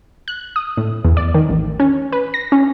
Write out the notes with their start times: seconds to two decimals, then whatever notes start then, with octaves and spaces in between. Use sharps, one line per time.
0.28 F#6
0.56 D#6
0.77 A2
1.04 E2
1.17 D5
1.34 D#3
1.49 A1
1.80 C#4
2.12 B4
2.34 A#6
2.52 C#4